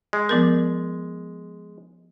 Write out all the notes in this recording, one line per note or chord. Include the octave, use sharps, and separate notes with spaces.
G#3
F3 B3 A#4